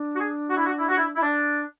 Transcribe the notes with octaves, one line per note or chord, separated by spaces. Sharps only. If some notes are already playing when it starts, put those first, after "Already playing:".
Already playing: D4
F#4
G#4
F#4
E4
F#4
E4
F#4
E4
E4
D4